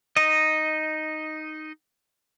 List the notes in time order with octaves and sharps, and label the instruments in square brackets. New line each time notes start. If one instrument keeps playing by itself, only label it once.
[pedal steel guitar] D#4 D#5